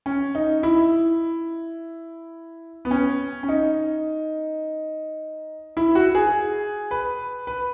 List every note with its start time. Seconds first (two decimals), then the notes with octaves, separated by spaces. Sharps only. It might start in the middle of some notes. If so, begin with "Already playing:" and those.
0.06 C#4
0.35 D#4
0.63 E4
2.85 B3
2.91 C#4
3.43 C#4
3.48 D#4
5.77 E4
5.95 F#4
6.15 G#4
6.91 B4
7.47 B4